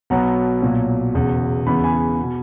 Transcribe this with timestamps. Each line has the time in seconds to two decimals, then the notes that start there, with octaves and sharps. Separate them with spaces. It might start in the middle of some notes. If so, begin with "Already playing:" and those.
0.10 B1 B2 F#3 B3 F#5 A#5
0.62 B1 A#2 F#3
1.14 E1 E2 C#3
1.67 E2 C#3 E3 B3 B5
1.84 G#5 B5
2.23 B2